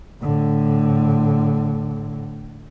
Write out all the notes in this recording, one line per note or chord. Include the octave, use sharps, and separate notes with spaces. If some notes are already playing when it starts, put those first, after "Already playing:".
A2 D3